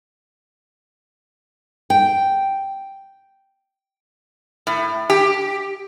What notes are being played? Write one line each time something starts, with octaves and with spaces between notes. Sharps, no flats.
G5
A2
G4